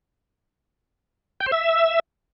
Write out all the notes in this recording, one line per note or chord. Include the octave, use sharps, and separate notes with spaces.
G5
C5
E5